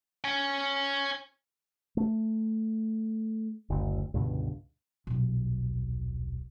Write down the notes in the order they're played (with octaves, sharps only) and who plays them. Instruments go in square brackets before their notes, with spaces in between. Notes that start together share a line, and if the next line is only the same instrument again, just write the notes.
[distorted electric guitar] C#5 G#5
[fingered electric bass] A3
F#1 D2
C#2 G2 B2 D3
[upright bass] D#1 B1